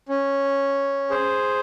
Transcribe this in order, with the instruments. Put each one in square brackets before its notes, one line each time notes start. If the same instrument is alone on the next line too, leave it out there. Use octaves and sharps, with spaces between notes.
[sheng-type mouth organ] C#4
G#4 C5